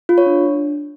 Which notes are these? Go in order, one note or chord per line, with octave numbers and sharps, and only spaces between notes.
F4
C#5
D4